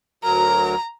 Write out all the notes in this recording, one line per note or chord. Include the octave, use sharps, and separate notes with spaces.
D2 F#3 A#4 A#5